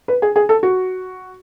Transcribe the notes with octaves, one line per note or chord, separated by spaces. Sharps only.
B4
G#4
G#4
A4
F#4